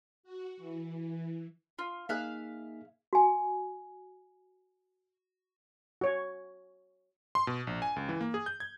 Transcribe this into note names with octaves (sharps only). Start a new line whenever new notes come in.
F#4
E3
F4
A#3 D#4 G#4 E5 F5 F#6
F#4 G#5
F#4 C#5
C6
B2
A#1
G#5
C#2
E3
A#3
G#4
G6
G#6